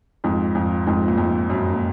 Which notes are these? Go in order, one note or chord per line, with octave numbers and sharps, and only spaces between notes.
F2 G#2
F2
F2 G#2
A#2
F2 G#2
F#2 A#2
A#2